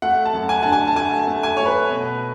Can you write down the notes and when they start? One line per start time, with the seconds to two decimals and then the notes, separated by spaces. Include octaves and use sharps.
0.02 A3 F#5
0.25 A5
0.34 F#2
0.49 G#5
0.63 D3 A5
0.73 G#5
0.88 A5
0.95 A3 G#5
1.19 A5
1.27 A3
1.43 G#5
1.57 A3 C#5
1.66 B4
1.90 B2